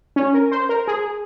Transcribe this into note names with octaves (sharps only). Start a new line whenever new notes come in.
C#4
A#4
C5
A#4
G#4